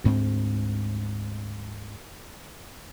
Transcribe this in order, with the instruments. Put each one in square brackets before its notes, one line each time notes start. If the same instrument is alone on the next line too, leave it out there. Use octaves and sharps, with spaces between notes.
[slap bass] D2 G#2 G#3 C4